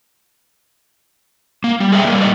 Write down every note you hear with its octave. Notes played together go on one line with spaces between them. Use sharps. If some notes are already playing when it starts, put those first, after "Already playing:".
A#3
G3
G#4 D#5 E5 G5
G3 A#3
A2 G3 D#4 D5 D#5